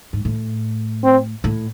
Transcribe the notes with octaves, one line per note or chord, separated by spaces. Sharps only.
G#2
A2
C4
A2